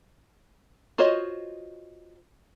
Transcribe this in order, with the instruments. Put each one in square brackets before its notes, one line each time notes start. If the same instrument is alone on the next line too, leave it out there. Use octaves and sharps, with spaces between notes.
[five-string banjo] F4 F#4 C5 C#5 D#5